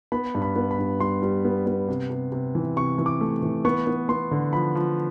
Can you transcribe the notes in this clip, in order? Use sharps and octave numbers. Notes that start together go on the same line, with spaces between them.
B3 B5
G2
B5
B3
B5
G2
G3 C6
G3
B3
B3
C3
C3
C3
E3
C3 C#6
E3
D6
A3
E3
B3 C#6
B3
B3 C6
D3
F3 B5
F3